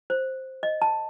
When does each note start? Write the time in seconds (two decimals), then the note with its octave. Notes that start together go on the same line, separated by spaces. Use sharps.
0.10 C5
0.63 D#5
0.82 A5